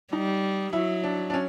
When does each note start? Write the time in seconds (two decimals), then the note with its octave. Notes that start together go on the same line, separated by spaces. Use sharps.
0.13 G3 D#4
0.73 F#3 E4
1.04 D4
1.30 D4
1.34 C#4